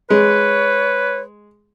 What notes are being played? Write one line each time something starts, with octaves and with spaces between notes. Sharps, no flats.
G#3 B4 C#5